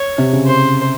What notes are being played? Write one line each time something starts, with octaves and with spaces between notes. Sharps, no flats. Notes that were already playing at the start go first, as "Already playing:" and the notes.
Already playing: C#5
C3
C#3
C5